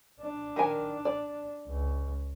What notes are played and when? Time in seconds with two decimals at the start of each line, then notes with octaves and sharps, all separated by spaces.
0.20 D4
0.56 D#3 A#4 G#5
1.05 D5
1.67 C#2